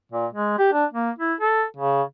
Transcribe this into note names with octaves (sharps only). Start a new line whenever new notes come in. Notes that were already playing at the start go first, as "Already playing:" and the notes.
A#2
G#3
G4
D4
A#3
E4
A4
C#3